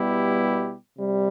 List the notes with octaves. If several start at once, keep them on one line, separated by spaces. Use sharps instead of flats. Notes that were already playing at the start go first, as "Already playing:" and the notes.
Already playing: B2 G3 B3 E4 G4
C3 G3